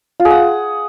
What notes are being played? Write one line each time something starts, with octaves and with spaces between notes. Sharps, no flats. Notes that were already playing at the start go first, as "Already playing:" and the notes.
F4
G#4
F#5